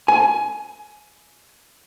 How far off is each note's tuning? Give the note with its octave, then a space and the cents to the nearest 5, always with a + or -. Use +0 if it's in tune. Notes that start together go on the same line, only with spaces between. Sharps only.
G#5 +15